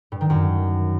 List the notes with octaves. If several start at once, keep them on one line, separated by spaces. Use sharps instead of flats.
G2
D#3
F#2